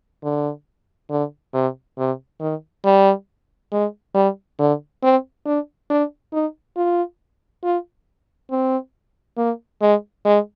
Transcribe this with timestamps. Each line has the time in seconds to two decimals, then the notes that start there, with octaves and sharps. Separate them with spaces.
0.24 D3
1.10 D3
1.54 C3
1.98 C3
2.40 D#3
2.85 G3
3.72 G#3
4.15 G3
4.59 D3
5.03 C4
5.46 D4
5.90 D4
6.32 D#4
6.76 F4
7.63 F4
8.51 C4
9.37 A#3
9.81 G#3
10.25 G#3